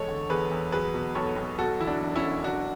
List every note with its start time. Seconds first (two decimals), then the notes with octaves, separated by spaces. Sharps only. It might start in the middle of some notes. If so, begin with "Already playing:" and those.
Already playing: E2 G#3 A4 C#5
0.08 D3
0.29 E2 G#4 B4
0.51 E2
0.72 F#3 G#4 B4
0.94 B2
1.15 B1 A4 C#5
1.36 B1
1.58 B2 F#4 A4
1.80 E2 E4
1.87 D4 F#4
2.02 E1
2.16 C#4 E4
2.23 E1
2.44 F#3 D4 F#4